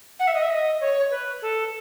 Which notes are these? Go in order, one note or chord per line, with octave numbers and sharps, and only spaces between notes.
F#5
E5
D#5
E5
D#5
C#5
B4
A4